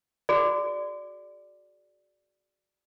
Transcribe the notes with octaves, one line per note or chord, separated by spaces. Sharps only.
F#4 G#4 D5